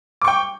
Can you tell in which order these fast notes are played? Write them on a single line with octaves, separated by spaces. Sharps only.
D6 C#6 G5